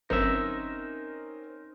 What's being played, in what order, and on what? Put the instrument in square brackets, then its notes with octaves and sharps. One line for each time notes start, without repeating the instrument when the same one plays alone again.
[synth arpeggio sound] G1 F#2 [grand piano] C4 [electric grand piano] C#4 A#4 [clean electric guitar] D#4 E5